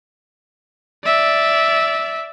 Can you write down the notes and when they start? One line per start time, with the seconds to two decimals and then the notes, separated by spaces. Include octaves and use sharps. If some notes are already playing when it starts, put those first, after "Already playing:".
1.05 D5 E5